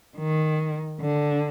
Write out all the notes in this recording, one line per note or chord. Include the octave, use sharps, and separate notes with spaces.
D#3
D3